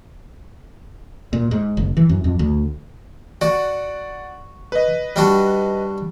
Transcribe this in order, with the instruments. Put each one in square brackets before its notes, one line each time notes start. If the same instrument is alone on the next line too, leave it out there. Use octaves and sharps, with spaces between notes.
[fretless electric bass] A#2
G#2
F#1
E3
F#2
F2
D2
[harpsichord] F#4 [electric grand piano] D5 F#5
[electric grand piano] B4 D#5
[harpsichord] G3 D4 F#4